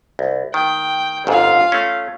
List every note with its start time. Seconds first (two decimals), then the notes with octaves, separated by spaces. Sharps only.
0.19 C2
0.54 D#3 G5
1.27 G1 F2 G#2 F4 F5
1.72 A3 C#4